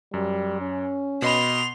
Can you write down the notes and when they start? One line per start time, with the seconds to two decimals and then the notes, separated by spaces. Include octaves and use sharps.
0.14 F#2 G3
0.61 C#4
1.22 B2 D#5 B5 C6 F7